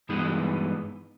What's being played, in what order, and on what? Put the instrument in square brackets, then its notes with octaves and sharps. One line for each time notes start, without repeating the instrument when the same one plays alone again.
[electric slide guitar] G2 E3 G#3 B3 D#4